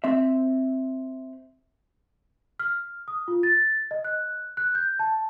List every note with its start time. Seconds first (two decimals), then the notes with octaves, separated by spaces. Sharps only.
0.04 C4 E5
2.60 F6
3.08 D#6
3.28 F4
3.43 A6
3.91 D#5
4.05 F#6
4.57 F#6
4.75 G6
4.99 A5